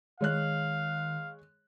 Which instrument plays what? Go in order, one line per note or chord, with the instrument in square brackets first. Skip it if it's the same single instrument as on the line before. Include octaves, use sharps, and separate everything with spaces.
[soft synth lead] D#3 [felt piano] G#3 C#5 F#6 [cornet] F5